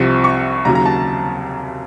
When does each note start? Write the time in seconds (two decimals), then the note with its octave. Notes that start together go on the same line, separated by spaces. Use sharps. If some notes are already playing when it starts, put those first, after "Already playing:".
Already playing: C2 C3 F3 C#6
0.24 C#6
0.65 D#2 C#3 F#3 A#5
0.75 A#5
0.86 A5